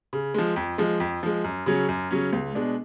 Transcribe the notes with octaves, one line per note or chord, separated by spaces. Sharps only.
C#3
F3 G#3
F2
F3 G#3
F2
F3 G#3
F#2
C#3 F#3 C#4
F#2
C#3 F#3 C#4
C#2
B2 G#3 D4